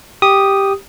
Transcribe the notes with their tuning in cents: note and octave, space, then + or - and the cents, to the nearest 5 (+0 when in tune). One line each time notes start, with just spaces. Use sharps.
G4 +0 D#6 -5